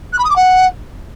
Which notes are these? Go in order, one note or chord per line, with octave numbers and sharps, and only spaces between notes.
F#6
B5
D#6
D6
F#5